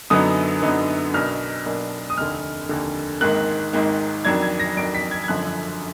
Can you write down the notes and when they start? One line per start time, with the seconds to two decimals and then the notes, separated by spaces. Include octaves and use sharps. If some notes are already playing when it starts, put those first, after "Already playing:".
0.10 F#2 D3 F#3 B3 D#4 D#6
0.62 F#2 D3 F#3 B3 D#4
1.14 B1 B2 A#3 D4 F6
1.66 B1 B2 A#3 D4
2.10 D#6
2.17 F1 D#2 D3 F6
2.69 F1 D#2 D3
3.21 G#1 G#2 D#3 A#3 F#6
3.73 G#1 G#2 D#3 A#3
4.25 F2 D#3 F#3 D4 G#6
4.42 G#6
4.59 A#6
4.76 F2 D#3 F#3 D4 D7
4.95 B6
5.11 G#6
5.24 G#6
5.28 G#1 F#2 D3 F3 F#6